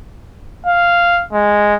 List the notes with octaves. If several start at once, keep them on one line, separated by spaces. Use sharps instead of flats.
F5
G#3